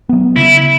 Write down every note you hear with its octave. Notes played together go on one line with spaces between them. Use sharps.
F#3 B3
C#3 E4